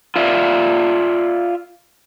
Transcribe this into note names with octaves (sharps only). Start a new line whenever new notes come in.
F4 D5 E5